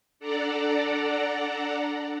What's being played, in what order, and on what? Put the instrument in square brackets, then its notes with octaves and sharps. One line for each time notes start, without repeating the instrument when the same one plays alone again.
[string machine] D4 A4 D5 F#5 A#5